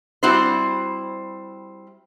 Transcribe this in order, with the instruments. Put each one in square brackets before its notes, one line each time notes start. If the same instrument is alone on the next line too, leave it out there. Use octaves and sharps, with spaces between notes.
[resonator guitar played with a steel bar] G3 C4 E4 F#4 C5